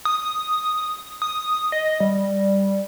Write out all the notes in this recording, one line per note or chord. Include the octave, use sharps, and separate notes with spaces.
D#6
D#6
D#5
G3